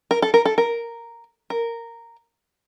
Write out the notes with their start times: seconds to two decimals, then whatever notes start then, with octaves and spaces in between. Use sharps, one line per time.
0.11 A#4
0.22 A4
0.34 A#4
0.45 A4
0.58 A#4
1.50 A#4